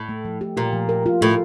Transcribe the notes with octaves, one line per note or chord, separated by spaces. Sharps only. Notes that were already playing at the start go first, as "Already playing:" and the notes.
Already playing: A2
A3
F3
G4
A#2 G4
F3
A#4
F4
A2 F4